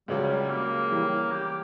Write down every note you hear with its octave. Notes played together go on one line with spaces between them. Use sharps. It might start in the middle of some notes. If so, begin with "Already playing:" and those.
C#2 C#3 F#3 G3 C#4
A#3
E3 G3 C#4
G4